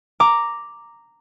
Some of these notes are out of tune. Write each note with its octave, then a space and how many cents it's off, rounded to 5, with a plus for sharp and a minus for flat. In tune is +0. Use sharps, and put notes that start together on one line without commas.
A#5 -5 D6 +0